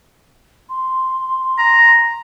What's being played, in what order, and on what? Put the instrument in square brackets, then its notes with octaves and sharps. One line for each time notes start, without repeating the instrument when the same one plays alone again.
[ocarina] C6
[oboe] A#5